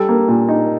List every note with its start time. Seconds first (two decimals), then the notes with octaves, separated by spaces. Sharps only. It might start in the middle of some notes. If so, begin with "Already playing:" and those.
Already playing: G3 A4
0.09 A#3
0.28 A#2
0.49 D#4